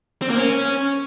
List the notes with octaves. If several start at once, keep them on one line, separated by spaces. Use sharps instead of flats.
C4
A#3
C#4